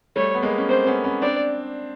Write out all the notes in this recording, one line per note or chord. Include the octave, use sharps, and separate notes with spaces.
G3 A3 C#5
B3
G#3 A#3
C#4
A#3 C4 C5
B3 C#4
B3 C#4
C4 D4 D5